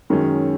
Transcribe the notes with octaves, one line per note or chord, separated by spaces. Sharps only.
F#2 D#3 G#3 C#4